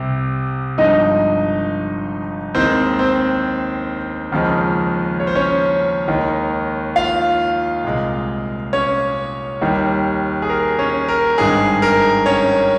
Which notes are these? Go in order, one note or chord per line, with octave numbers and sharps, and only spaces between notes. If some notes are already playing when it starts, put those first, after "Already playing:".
Already playing: C2 C3 G3
G1 G2 F3 G#3 D#4 D#5
D#2 D#3 G#3 C4 C5
C4 C5
D#2 C#3 F3 G#3
C#5
C5
C#4 C#5
D#2 D#3 G#3
F4 F5
C2 A#2 G#3
C#4 C#5
D#2 D#3 G3
G#4
A#4
C#4 C#5
A#4
G#1 G2 D#3 G#3 G#4
A#4
C#4 C#5